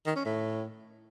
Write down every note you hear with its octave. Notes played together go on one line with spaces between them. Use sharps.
D#3
C#4
A2